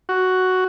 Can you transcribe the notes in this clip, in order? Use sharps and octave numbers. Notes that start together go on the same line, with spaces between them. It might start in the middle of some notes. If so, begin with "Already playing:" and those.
F#4